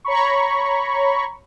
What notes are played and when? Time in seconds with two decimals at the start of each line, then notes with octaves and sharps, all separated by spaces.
0.05 C#5 A#5 B5 C#6